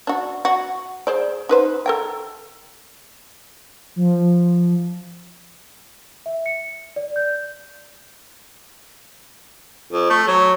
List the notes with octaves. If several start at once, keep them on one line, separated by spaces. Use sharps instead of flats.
D4 F#4
F#4
G#4 C5 D5
D#4 B4 C5
A4 A#4 G5
F3
E5
C#7
D5
G6
F2
A3
F#3